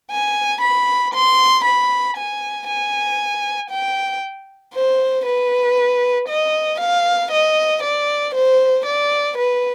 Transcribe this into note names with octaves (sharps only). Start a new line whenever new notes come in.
G#5
B5
C6
B5
G#5
G#5
G5
C5
B4
D#5
F5
D#5
D5
C5
D5
B4